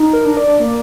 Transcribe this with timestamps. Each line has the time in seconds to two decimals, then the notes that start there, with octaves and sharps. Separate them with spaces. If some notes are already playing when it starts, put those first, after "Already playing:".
Already playing: D#4
0.13 A#4
0.25 D4
0.37 D5
0.60 A#3